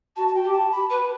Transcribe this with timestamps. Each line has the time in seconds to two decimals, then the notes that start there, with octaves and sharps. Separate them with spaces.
0.16 F#4 A5
0.28 A5
0.35 G5
0.44 G4
0.53 A5
0.72 B5
0.90 B4 B5